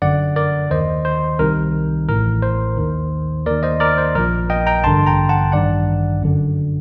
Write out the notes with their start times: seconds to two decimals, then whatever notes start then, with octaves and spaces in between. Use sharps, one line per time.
0.02 G1 F#2 D3 D5 F#5
0.36 A#4 D5
0.70 D#2 D#3 C5 D#5
1.05 C5
1.39 C2 C3 D#3 A#4
2.09 A1 A2 A#4
2.43 C5
2.77 D#2 D#3
3.46 D#2 D#3 A#4 D5
3.63 C5 D#5
3.80 A#4 D5
3.98 C5
4.15 A#1 A#2 A#4
4.50 D#5 G5
4.67 G5 A#5
4.84 A1 G2 D3 A5 C6
5.07 G5 A#5
5.29 F#5 A5
5.52 A1 G2 D#3 D5 F#5
6.21 G1 F#2 D3